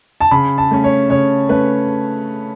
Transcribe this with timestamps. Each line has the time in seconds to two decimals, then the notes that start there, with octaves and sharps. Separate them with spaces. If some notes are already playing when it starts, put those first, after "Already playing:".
0.20 A5
0.31 C#3 B5
0.58 A5
0.71 A3 C#4
0.84 C#5
1.10 C#3 C#5
1.49 A3 C#4 B4